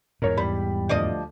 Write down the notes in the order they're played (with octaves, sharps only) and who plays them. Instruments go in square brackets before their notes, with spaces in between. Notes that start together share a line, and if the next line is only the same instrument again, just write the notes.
[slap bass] E2 G#2 [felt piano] A#4 C#5
[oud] G3 [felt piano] B5
[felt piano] D2 [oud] F3 D5 D#5